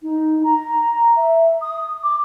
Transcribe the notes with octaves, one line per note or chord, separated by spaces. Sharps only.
D#4
A#5
E5
D#6
D6